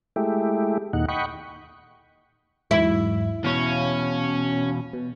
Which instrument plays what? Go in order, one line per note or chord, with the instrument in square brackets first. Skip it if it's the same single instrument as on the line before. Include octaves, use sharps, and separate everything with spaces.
[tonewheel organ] G#3 A3 E4 G4
D#2 A#2 D#4 F#5
D#5 F#5 G5 B5 C#6
[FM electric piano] E2 G#2 F#3 [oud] E4
[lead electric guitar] E2 B2 [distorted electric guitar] C#4 [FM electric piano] C#5 F5
[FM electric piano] B2